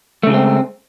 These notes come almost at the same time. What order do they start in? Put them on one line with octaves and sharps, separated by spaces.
A3 C#3 G#3 C4